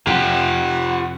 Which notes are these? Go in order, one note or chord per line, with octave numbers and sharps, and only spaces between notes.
F2 C3 F4 G4 F#5 G5